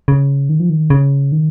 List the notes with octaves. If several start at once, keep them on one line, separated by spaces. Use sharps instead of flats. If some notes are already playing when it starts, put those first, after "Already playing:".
C#3
D#3
F3
D#3
C#3
D#3